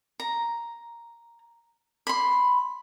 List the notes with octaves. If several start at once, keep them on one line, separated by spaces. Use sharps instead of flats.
A#5
B5 C6